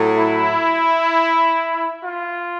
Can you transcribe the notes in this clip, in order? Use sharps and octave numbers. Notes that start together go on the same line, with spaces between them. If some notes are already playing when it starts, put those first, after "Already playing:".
Already playing: A2 F#3
E4
F4